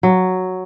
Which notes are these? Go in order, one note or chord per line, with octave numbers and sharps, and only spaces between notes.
F#3